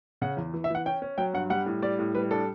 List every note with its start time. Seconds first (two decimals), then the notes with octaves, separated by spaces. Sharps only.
0.22 C#3 F#5
0.37 E2
0.54 E3
0.64 E5
0.70 E3 F#5
0.86 C#4 G5
1.02 C#4
1.18 F#3 G5
1.34 G2 F#5
1.50 G3 F#5
1.66 A2
1.82 G3 D5
1.99 A2
2.15 G3 B4
2.31 D4 A4